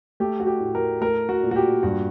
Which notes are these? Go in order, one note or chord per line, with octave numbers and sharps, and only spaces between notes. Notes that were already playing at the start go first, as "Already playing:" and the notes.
A3 G4
F#4
G4
A2
A#4
A3 A#4
F#4
A#2
F#4
G4
G2 F#4